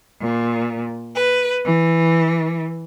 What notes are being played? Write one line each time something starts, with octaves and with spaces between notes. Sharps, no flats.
A#2
B4
E3